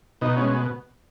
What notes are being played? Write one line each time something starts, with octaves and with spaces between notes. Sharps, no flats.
B2 D#4
G#3 C#4